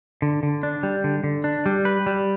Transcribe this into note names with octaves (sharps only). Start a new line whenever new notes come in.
D3
D3
D4
G3
D3
D3
D4
G3
B4
G3